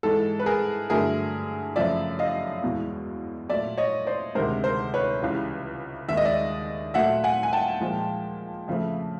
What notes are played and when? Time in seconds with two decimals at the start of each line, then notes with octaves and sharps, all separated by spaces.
0.03 G#2 E3 G#3 A4
0.39 B4
0.46 G#4 A#4
0.90 G2 D3 F#3 A3 G#4 A#4
1.76 F#2 C#3 F3 A3 D5 E5
2.19 D#5 F5
2.63 E2 B2 G#3
3.49 A#2 F#3 A3 D5 E5
3.78 C#5 D#5
4.07 C5 D5
4.35 D2 C3 D#3 G#3 A#4 C5
4.64 A#4 C5
4.94 B4 C#5
5.22 C#2 C#3 E3 G3
6.08 D#2 D#3 G#3 E5
6.17 D#5
6.25 D5 E5
6.94 A#2 F#3 A3 E5 F#5
7.24 F#5 G#5
7.43 G#5
7.53 G5 A5
7.81 A#2 F3 G#3
8.68 F2 C#3 F3 A3